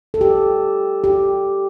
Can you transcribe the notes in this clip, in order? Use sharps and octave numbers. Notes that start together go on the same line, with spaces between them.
A4
G4
G4